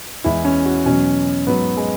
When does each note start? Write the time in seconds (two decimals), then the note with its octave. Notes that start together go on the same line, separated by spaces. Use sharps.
0.24 E2 E3 G#3 E4
0.44 C#4
0.66 F#4
0.85 E2 B2 F#3 C#4
1.47 G#2 F#3 B3
1.77 G#3